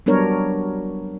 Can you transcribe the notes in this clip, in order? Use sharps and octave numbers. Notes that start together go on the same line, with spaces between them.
F#3 G3 B3 D4 A#4 C#5